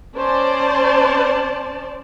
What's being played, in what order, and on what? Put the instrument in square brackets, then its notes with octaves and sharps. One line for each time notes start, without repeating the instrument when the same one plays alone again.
[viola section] C#4 C5 D5 A5